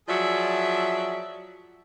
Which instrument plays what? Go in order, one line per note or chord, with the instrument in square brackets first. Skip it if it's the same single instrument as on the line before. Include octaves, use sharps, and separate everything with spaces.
[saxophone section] F3 F#3 G#4 D5 E5